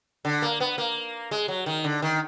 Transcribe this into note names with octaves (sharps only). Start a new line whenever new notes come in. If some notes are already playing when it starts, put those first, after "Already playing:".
D3
A#3
B3
A#3
G#3
F#3
D#3
D3
D#3